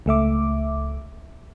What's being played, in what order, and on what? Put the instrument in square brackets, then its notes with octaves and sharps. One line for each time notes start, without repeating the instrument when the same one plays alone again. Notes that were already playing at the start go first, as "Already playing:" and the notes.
[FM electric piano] C#2 A3 E5 D6